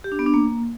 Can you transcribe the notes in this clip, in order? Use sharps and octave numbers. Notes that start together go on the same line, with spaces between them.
G4
D4
B3
D4
A#3